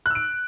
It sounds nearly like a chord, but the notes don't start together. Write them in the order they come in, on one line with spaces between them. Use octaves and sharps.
F#6 E6 D7